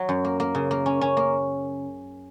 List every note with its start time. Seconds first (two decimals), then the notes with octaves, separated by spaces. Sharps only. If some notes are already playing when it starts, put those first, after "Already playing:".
Already playing: F#3
0.09 F#2
0.25 A#3
0.40 A#3
0.55 C#3
0.71 A#3
0.86 C#4
1.01 C#4
1.17 A#3